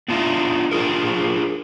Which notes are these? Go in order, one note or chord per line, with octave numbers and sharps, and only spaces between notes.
B3 D4 F4 C#5 D#5 E5
D4 F4 G#4 A#4